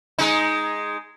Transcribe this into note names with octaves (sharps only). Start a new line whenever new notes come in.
G#3 D#4